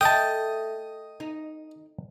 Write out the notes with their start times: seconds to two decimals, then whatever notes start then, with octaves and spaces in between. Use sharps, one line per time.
0.01 A3 D#5 G5 A5 D#6
1.20 D#4